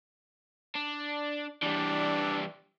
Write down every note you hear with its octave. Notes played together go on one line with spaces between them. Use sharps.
D4
E3 G3 D4